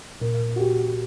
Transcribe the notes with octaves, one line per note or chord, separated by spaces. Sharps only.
A#2 A#4
F#4
G4